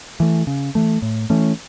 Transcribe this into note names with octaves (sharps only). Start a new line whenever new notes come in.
E3 A3
C#3
E3 A3
A2
E3 A3 C#4